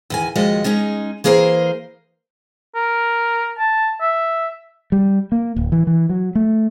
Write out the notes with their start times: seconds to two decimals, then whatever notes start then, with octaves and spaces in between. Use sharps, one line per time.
0.10 E2 D#3 G#5
0.35 D#2 F3 G#3 F#4 D#5
0.64 G#3 C#4 D#4 G#4
1.24 E3 A#3 G#4 A#4 C5
2.75 A#4
3.59 A5
4.01 E5
4.92 G3
5.32 A#3
5.56 D1
5.72 E3
5.87 E3
6.09 F#3
6.35 A3